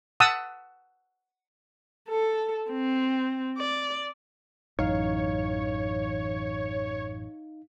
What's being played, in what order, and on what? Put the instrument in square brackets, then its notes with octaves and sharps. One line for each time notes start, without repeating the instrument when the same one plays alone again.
[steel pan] F#5 A5 D#6 E6
[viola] A4
C4
D5
[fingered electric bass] A1 F#2 E3 [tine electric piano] D#4 F5 [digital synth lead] C#5